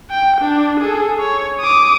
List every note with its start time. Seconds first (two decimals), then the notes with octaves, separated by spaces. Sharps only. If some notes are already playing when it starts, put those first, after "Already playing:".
0.11 G5
0.41 D4
0.80 G#4 A4
1.19 C#5
1.61 D6 D#6